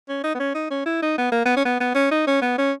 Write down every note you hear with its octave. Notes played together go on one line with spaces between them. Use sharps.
C#4
D#4
B3
C#4
D#4
C#4
E4
D#4
B3
A#3
B3
C#4
B3
B3
C#4
D#4
C#4
B3
C#4